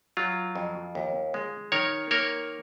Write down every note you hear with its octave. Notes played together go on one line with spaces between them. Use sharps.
F#3 F4
F2
D#2
G#3
D#3 A#4 C#5
A#3 A#4 C#5